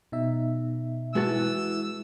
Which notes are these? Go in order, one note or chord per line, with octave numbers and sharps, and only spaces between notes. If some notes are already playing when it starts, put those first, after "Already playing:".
B2 D#4 E5
E3 G#3 F#4 A5 E6